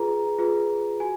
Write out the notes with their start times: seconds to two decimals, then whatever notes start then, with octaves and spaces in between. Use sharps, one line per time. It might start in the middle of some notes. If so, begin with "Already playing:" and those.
Already playing: F4 G#4 B4 A#5
0.38 F4 G#4 B4
1.00 F#4 G#5